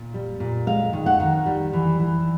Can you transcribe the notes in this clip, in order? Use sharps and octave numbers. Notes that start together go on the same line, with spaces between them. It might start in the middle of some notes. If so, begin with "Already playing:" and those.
Already playing: A#2
G3
A#2
G#3 F5
D#3
F#5
D#3
G3
E3
E3